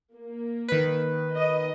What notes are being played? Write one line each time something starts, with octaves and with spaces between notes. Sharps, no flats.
A#3
D#3 B4
D#5